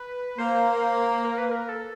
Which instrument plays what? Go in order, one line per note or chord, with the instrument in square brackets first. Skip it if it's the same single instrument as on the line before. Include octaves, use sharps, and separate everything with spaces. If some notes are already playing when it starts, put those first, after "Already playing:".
Already playing: [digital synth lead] B4
[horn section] A#3 [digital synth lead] C5
[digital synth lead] A#4
B4
A#4
A4